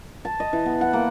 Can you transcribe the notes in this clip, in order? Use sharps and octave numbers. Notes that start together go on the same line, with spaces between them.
A5
D#5
E3
B3
F#5
A#3